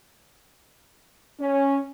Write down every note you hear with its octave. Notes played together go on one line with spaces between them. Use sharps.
C#4